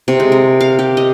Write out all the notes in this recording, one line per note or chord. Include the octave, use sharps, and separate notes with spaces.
C3
G#3
A#4
F5
G4
D#5